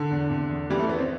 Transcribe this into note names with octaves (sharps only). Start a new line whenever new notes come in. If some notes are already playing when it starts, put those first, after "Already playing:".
Already playing: D3 D4
E2
C3
E2
E3 G3
A3
E2 B3
C4